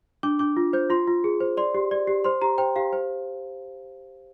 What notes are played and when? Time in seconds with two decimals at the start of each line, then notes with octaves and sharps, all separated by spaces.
0.23 D4 D6
0.39 D4 D6
0.57 F4
0.73 C5 G6
0.90 F4 C6
1.08 F4
1.24 G#4
1.41 C5
1.57 D5 C6
1.74 G4
1.91 D5
2.07 G4
2.24 C5 C6
2.42 G4 A#5
2.58 C5 G5
2.76 G4 F5
2.93 C5